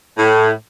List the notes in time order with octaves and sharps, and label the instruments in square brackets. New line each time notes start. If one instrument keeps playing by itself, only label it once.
[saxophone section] A2